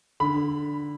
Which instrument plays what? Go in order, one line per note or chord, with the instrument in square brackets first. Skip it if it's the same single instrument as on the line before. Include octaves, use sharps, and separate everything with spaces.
[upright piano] D3 B5